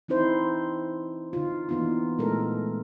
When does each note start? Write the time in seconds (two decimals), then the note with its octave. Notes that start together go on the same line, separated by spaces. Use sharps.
0.08 E3 C4 D#4 E4 C5
1.33 D3 D#4 F4
1.69 E3 A#3 B3 D4 D#4 F4
2.18 A#2 G#3 A3 A4 A#4